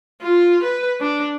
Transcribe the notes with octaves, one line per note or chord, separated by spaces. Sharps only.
F4
B4
D4